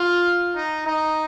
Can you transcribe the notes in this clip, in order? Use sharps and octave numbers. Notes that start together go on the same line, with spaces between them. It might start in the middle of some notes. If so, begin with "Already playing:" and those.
Already playing: F4
D#4
D#4